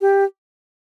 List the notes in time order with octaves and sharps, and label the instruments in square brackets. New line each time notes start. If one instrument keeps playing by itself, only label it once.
[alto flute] G4